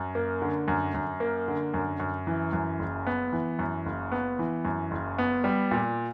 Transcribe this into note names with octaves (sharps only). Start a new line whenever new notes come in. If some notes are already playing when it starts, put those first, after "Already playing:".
Already playing: F#2
A#3
D3
F#2
F#2
A#3
D3
F#2
F#2
E3
F#2
F#1
B3
E3
F#2
F#1
B3
E3
F#2
F#1
B3
G3
A#2